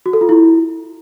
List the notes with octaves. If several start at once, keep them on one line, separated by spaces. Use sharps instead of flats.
F#4
A4
F4
E4